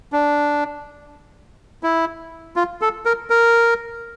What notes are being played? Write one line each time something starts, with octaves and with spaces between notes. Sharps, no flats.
D4
E4
F4
A4
A#4
A#4